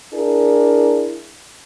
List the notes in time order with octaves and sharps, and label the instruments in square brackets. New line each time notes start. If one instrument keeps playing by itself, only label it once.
[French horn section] D4 E4 G#4 A#4